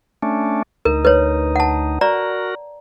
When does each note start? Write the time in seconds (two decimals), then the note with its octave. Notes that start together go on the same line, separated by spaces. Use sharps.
0.22 A3 C#4 D4
0.85 D2 D#4 A#4
1.05 B4 C#5
1.56 F#5 A5
2.01 F#4 A#4 D5 A#5